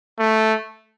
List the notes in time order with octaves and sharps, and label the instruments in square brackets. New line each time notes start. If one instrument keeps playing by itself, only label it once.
[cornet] A3